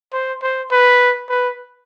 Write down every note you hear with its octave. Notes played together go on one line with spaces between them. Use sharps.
C5
C5
B4
B4